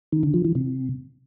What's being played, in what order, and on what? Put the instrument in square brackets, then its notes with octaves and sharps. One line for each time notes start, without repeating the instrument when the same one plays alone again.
[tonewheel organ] D#3
D3
F3
E3
C3